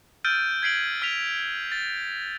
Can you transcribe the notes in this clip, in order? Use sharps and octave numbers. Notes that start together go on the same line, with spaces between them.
E6 F6 G6 A6 D7 D#7
G#6 B6 C7 D7 F#7
F6 B6 F7
A6